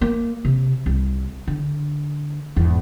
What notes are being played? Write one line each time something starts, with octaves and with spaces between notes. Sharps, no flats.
A#3
C3
C2
D3
E2 G#2